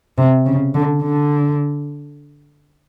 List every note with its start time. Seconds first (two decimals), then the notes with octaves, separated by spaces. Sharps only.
0.18 C3
0.46 C#3
0.74 D3
1.02 D3